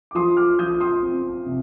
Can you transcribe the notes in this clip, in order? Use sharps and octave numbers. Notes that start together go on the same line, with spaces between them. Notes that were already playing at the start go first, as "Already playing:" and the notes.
D6
F3 C6 D#6
D6 F6
F3 D#6 G6
C6 D#6
C4
C3